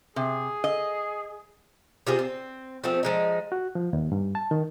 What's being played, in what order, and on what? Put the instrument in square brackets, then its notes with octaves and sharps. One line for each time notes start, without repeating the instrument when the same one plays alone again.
[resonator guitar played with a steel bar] C3 [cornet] G#4
[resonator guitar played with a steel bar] D#5
[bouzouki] C3 F4 G#4 C5
C4
F3 A3 C4 G#4
F3 G#3 D#4
[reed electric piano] F#4
F3
D#2
G2
A5
D#3